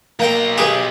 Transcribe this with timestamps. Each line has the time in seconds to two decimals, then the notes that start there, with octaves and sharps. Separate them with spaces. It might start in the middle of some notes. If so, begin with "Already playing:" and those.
0.19 B1 A#3 G5 A#5 C6
0.58 G4 G#4 B4